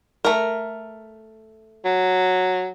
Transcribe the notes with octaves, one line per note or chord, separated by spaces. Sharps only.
A3 A#4
F#3